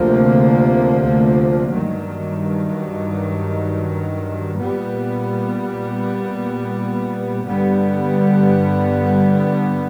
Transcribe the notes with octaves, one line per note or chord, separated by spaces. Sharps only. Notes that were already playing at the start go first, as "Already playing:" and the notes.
Already playing: D2 C3 F3 A#3
G2 D#3 F#3
A#2 G3 B3
G2 D3 G3 B3